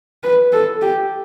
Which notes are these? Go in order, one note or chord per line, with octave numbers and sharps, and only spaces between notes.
B4
A4
G4